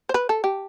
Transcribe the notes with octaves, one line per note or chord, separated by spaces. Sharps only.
C5
B4
A4
G4